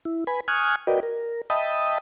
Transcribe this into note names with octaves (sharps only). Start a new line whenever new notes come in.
E4
B4 G#5 B5
G#5 C#6 D#6 F6 F#6 G#6
F#4 A#4 B4 D5 D#5 G5
A#4
D#5 E5 G5 A5 B5 D#6